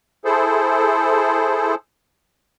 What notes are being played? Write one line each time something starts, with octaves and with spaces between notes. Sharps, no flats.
E4 G#4 A4 C5